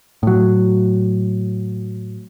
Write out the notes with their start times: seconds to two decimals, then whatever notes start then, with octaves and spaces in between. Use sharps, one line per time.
0.23 A2 F#3